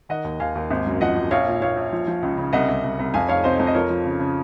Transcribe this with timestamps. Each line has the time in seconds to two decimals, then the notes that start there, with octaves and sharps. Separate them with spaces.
0.09 D#3 D#5 F#5
0.24 D#2
0.40 D#2 F5 G#5
0.55 D#2
0.70 G#1
0.86 F#2
1.01 F3 D#5 F#5
1.16 F#2
1.31 A#1 C#5 F5
1.46 A#2
1.62 A#1 C#5 F5
1.76 A#1
1.92 F3
2.07 F3
2.22 C#2
2.37 C#3
2.53 C2 D#5 F#5
2.68 C2
2.84 C2
2.99 C2
3.14 F2 F5 G#5
3.28 F1 C#5 F5
3.44 C3 C5 D#5
3.59 F2
3.67 D#5
3.74 F3 A#4 C#5
3.90 F3
4.05 C#3
4.20 C#3